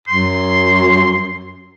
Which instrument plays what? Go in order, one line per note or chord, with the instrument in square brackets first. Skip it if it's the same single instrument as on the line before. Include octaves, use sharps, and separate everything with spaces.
[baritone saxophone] F#2 [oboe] C6